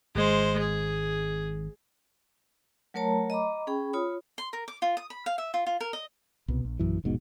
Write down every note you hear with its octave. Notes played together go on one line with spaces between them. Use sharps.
G#1 G#3 C5
G#4
F#3 A3 A#4 C#5 A5 A#5
D#5 A#5 B5 D6
C#4 G#4 G5 B5
F4 C#5 B5 D#6
C6
A#4
D6
F4
D#6
B5
F5
E5
F4
F4
A#4
D#5
C2 B2
A#1
A#1 F#2 E3
E1 A#1 G#2 B2